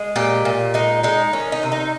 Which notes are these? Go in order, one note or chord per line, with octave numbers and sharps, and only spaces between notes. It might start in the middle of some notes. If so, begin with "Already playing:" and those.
Already playing: G#3
A#2 G4
A#2
G#3 D#4
G#3 D#4
D#3 C#4
D#4
C3
D#4